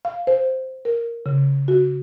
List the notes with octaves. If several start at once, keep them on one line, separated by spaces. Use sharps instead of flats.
F5
C5
A#4
C#3
F#4